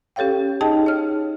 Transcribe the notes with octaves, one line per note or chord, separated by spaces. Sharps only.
C#4 G4 A4 C#5 F5 G5
D#4 G#4 D#5 G5 A5
C#5 F6